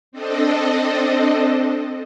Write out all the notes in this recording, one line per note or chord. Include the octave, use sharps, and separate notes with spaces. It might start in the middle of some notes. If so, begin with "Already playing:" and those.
C4 D4 A4 D#5